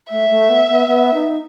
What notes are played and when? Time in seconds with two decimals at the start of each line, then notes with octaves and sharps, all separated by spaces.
0.10 A3 E5
0.30 A3
0.49 B3
0.69 B3
0.87 B3
1.14 D#4